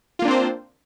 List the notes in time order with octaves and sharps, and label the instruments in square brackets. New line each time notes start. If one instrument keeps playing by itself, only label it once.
[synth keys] F4
A#3
D4
C4
C5